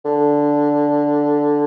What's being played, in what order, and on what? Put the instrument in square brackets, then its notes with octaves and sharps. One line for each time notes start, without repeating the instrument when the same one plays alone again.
[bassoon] D3